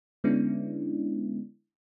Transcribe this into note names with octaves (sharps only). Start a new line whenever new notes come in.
D3 G#3 B3 C#4 D4 E4